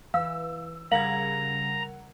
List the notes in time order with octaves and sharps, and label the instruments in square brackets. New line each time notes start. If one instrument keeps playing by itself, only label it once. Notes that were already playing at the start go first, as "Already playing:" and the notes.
[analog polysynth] E3 [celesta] F5 [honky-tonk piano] E6
[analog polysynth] C#3 G3 [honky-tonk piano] A#4 F#5 G#6 [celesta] F5 F#7 [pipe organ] A#5